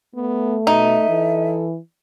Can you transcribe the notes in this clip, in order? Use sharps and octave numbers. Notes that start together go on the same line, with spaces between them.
A3 B3
B2 D#4 E5
E3 A4